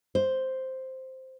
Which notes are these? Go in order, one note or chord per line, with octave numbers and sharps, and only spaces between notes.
C5